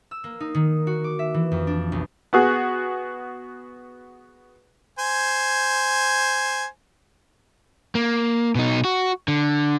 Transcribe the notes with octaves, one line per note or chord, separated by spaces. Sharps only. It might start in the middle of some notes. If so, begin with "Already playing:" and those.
E6
A#3
D#4
D#3
F#4
D6
E5
E3
F2
D4
B1
B3 F#4 G#4
C5 G#5
A#3
B2 D#4
F#4
D3